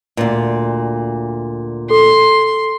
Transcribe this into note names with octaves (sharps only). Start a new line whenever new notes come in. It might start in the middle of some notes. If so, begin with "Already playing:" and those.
D2 A#2
A4 C6